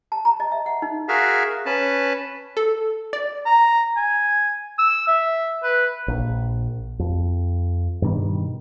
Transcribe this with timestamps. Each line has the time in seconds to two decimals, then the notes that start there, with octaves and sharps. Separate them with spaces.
0.12 A5
0.25 A#5
0.40 D#5
0.52 E5
0.66 F#5
0.82 D#4
1.09 F#4 G#4 A#4 E5 F5
1.66 C#4 B4 A5
2.57 A4
3.13 D5
3.46 A#5
3.97 G#5
4.79 E6
5.08 E5
5.63 B4
6.08 A#1
6.99 F2
8.02 G2 B2 D#3 G3